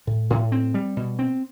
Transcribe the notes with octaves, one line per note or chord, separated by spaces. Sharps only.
A2
A2
C4
G3
B2
C4